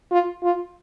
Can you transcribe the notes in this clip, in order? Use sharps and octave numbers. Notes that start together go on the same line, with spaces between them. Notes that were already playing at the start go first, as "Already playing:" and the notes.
F4
F4